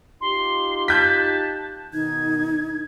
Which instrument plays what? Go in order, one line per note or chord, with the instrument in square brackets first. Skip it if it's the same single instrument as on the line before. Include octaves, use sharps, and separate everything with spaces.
[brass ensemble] D#4 F4 G4 [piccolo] C6
[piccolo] A5 [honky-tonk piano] F#6 G6 B6
[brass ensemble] B2 D#3 [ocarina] D#4 [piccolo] G#6